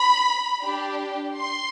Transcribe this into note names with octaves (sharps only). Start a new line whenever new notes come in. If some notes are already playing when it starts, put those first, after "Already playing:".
Already playing: B5
D4 G4
C6